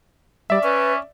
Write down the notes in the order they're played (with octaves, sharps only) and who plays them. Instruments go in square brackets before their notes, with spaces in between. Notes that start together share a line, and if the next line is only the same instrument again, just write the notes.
[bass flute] G3 [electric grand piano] D5 E5
[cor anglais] C#4 [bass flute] B4